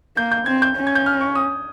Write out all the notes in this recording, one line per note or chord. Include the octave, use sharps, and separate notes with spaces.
A#3 G6
G6
C4 G#6
G6
C#4
G#6
G6
F6
C#6
D#6